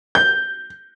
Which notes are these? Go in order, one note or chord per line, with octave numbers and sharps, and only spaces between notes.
G6